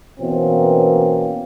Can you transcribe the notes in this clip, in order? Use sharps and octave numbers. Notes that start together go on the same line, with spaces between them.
B2 E3 A#3 C4 C#4